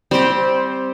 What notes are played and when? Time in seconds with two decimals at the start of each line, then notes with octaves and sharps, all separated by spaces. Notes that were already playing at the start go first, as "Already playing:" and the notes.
0.11 G3 C4 G4 C5